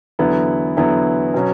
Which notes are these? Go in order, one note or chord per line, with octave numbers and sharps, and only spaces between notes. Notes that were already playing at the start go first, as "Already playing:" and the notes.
E2 D3 F#3 B3 E4
E2 D3 F#3 B3 E4
B2 F#3 C#4